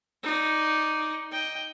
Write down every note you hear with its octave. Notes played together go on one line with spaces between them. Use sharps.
D#4 D5
D#5 G5